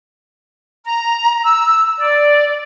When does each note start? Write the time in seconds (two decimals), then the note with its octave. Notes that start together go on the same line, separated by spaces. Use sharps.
0.84 A#5
1.45 E6
1.98 D5